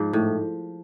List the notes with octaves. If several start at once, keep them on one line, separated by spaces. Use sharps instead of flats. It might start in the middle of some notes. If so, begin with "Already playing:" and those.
Already playing: G#2 F3
A2